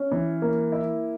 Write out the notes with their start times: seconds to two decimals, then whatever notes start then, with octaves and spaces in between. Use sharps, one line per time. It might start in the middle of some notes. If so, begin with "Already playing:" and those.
Already playing: C#4
0.11 E3
0.42 A#3
0.72 E4